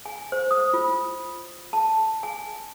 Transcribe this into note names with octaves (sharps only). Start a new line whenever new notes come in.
G#5
C5
D#6
F4
A5
G#5